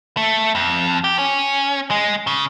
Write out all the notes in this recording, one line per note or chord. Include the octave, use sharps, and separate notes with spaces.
A3
F2
G4
C#4
G#3
C#3